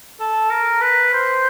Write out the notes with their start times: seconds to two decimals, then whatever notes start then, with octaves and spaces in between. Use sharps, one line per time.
0.20 A4
0.51 A#4
0.81 B4
1.13 C5